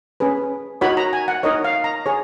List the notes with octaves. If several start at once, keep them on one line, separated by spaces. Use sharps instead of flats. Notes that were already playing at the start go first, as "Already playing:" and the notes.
C#4 G#4 B4
D#4 F#4 A#4 C#5 B5
A#5
G#5
F#5
D#4 A#4 C#5 D#5
F5
A#5
G#4 C#5